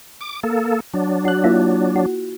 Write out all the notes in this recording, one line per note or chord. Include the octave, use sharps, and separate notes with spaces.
D6
A#3 A4
F#3 D4
F#4 F#6
A#3 E4 F4
F#4